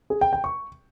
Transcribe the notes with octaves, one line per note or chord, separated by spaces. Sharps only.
G#4
G5
G5
C#6